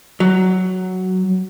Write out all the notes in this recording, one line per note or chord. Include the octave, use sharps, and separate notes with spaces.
F#3